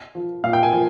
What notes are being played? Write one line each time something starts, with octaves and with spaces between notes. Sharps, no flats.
F3
A#2 F5
G5
G#5
F3